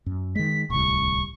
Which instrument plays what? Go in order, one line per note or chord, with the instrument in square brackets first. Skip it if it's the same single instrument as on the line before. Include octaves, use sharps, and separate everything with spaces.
[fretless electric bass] F#2
[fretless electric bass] D#3 G#3 [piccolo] B6
[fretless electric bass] D1 C2 [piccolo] C#6